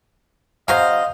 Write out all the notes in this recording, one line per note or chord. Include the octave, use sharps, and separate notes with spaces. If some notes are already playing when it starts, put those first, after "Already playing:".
C#3 F#3 C5 D#5 F5